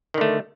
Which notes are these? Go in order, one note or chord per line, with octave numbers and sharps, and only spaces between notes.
D3 D#3 A3